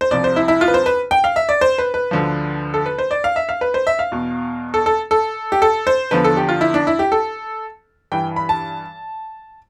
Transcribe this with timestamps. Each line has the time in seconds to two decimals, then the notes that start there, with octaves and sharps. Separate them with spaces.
0.01 C5
0.11 C2 C3 F3 D5
0.24 C5
0.36 E4
0.48 E4
0.61 F4
0.68 B4
0.74 C5
0.86 B4
1.11 G5
1.24 F5
1.36 E5
1.49 D5
1.61 C5
1.78 B4
1.94 B4
2.11 D2 D3 F3
2.74 A4
2.86 B4
2.98 C5
3.11 D5
3.24 F5
3.36 E5
3.49 F5
3.61 B4
3.74 C5
3.87 E5
3.99 F5
4.12 E2 B2
4.74 A4
4.86 A4
5.11 A4
5.52 G4
5.62 A4
5.87 C5
6.11 E2 D3 F3 B4
6.24 A4
6.37 G4
6.49 F4
6.61 E4
6.74 D4
6.87 E4
6.99 G4
7.12 A4
8.12 G2 E3 G5
8.36 B5
8.49 A5